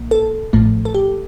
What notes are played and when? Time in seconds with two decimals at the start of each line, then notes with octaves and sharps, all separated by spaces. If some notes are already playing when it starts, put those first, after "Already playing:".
Already playing: A#1 A#2 A#3
0.11 A4
0.53 A1 A2 F3 A3
0.85 A4
0.94 G4